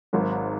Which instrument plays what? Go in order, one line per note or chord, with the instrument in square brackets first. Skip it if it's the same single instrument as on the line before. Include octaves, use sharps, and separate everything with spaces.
[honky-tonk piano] G#1 G#2 F#3